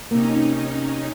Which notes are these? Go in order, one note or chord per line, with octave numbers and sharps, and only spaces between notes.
C3 A#3 C#4 D#4